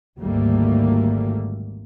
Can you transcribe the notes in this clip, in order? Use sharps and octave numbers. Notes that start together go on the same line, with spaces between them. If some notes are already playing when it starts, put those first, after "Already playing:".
G#1 D2 G#2 G3 A3 A#3